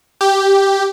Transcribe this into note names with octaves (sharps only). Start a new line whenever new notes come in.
G4